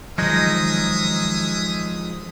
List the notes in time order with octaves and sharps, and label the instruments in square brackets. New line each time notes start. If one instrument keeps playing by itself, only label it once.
[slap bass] D#3 F#3 [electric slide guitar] F3 G#3 D#4 [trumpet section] C#4 E5 D#6